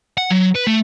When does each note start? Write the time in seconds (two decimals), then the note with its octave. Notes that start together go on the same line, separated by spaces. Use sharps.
0.17 F#5
0.30 F#3
0.55 B4
0.67 A3